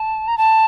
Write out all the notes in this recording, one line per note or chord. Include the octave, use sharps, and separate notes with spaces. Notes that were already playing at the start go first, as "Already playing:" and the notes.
Already playing: A5
A#5
A5